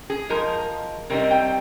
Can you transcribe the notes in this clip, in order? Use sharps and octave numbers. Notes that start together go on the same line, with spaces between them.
G#4
F3 G#3 D#4 A#4
C3 G3 C4 D#4 A#4
G5